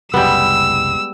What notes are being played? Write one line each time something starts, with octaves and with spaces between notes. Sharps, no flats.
F#1 C2 G3 G#3 B3 E6